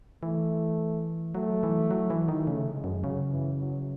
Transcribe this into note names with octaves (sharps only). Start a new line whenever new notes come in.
E3 A3
F#3 A3
E3
F#3
E3
D#3
C#3 A3
G#3
F#2
C#3 F#3
E3
F#3